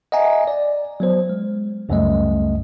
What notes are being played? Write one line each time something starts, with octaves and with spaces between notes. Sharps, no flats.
D#5 E5 F#5 G#5 A#5
D5
F#3 B3 C5
G#3
C#2 F#2 C#3 G3 A3 D#5